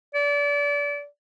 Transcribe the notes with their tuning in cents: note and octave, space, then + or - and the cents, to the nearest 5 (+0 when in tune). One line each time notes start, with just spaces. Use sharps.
D5 -30